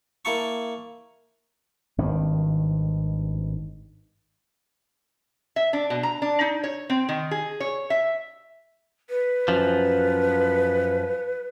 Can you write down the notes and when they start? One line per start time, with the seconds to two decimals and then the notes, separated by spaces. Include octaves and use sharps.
0.25 A#3 E4 E5 G5 A5 C#6
1.98 G#1 G2 D#3
5.56 E5
5.73 D4
5.90 B2
6.03 A#5
6.22 D4
6.41 D#4
6.64 C#5
6.90 C4
7.09 D#3
7.31 G#4
7.60 C#5
7.90 E5
9.10 B4
9.48 F#2 F3